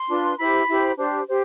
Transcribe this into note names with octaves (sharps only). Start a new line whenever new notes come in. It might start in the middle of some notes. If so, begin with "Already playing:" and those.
Already playing: C6
D4 F4 B4
E4 G4 C5 B5
E4 G4 C5
D4 G4 C5
G4 C5